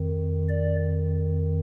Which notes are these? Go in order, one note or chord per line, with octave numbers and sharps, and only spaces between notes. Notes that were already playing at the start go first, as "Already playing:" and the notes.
Already playing: F2 D#3
D5